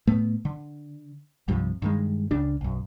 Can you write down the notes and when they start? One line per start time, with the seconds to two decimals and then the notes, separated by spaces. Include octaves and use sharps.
0.07 A2 A3 B3
0.45 D3
1.48 C2 G2 C3 F3
1.82 G2 D#3 G#3
2.31 C#2 C#3 D4
2.61 B1 F#2